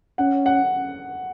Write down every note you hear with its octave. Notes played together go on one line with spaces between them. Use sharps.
C#4 F#5
F#5